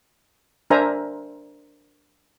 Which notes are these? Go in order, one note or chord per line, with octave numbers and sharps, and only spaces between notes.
D4 A#4 C5 E5 G#5 A#5